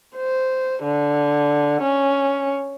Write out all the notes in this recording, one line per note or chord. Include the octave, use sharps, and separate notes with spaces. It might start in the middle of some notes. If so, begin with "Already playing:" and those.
C5
D3
C#4